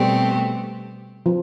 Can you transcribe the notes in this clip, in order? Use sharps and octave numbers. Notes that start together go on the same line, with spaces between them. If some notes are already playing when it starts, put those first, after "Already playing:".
Already playing: B2 G3 A3 C4 G4
F3